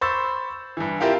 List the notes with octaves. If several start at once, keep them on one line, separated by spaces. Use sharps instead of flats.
C5 B5 C#6 E6 G6 A6
G2 E3
C4 E4 F4 G4 A#4 F5